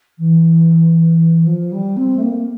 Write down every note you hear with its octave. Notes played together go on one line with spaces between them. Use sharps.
E3
F3
G3
C4
A3
A#3